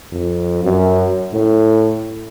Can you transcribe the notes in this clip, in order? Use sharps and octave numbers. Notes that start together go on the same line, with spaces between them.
F2
F#2
A2